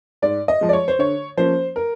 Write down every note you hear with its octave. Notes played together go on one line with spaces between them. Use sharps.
G#2 D5
D#5
F3 G#3
D5
C#5
C5
D3 C#5
F3 A#3 C#4 C5
A#4